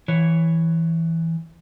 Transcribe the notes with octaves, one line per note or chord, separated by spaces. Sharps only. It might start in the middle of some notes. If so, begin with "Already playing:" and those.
E3 C#5